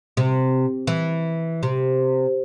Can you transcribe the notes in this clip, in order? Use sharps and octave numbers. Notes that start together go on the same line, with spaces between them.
C3
E3
C3